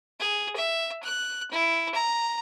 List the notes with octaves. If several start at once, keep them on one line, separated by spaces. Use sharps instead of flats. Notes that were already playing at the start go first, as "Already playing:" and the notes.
G#4
E5
F#6
E4
A#5